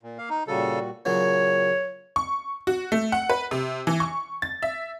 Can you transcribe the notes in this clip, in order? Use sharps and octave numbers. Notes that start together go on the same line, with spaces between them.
A#2
A#3 F5
D#4
A#2 C#3 G3 F#4 A4
A#2 C#3 F#3 C#5
C#6
F#4
A3
F#5
B4
C3
E3
C#6
A6
E5